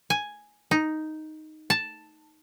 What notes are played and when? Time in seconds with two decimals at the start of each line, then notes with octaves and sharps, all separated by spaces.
0.10 G#5
0.71 D#4
1.70 A5